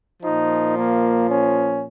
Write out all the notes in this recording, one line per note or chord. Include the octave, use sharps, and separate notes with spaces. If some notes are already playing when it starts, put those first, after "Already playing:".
A#2 F3 D#4
A#3
C#4